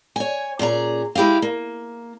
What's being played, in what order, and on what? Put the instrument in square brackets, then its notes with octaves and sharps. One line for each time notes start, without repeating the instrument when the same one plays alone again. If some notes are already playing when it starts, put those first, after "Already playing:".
[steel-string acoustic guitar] C#5 G#5
A#2 C#4 G#4 A#5
G#3 E4 G4 G#4 F5
A#3